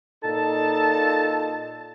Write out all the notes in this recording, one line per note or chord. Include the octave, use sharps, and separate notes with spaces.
A#2 D#4 A4 A5